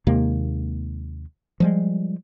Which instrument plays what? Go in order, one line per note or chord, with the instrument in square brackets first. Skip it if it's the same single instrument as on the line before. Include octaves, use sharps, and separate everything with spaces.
[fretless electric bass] D#2 C3 G#3 A#3
F3 G3 G#3